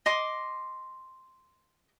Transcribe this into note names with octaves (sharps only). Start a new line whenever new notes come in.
D#5 C6 D6